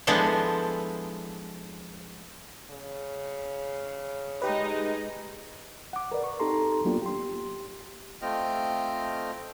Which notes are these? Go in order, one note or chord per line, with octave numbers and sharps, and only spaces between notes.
F3 G#3 B3 D4 E4 A4
C#3
G#3 D#4 G4 B4 D#5
F#5 D6
A#4 B4 D5
C#6
C4 D#4 G4 A4 A#5 C6
F#3 A#3 B3 D4 F4 G4
G4 C6
A3 C4 F4 D#5 G5 F6